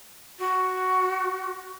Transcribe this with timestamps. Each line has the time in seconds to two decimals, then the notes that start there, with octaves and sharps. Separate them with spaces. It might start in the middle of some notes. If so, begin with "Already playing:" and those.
0.39 F#4